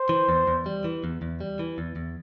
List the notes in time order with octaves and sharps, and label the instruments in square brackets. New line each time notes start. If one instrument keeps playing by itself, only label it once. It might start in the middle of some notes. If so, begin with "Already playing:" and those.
Already playing: [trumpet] C5
[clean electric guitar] E3
E2
E2
G3
E3
E2
E2
G3
E3
E2
E2